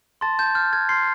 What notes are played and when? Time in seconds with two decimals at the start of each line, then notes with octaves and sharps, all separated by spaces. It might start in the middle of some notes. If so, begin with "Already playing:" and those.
0.21 A5 C6 A6
0.39 A5 G6
0.55 F6 G6
0.73 F6 G#6
0.89 C6 F6 C7